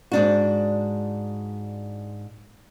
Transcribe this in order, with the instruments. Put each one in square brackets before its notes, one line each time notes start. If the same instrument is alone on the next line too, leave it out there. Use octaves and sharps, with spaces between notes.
[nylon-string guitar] G#2 D4 F#4